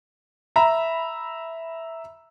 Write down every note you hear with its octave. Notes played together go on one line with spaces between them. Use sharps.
E5 A#5 B5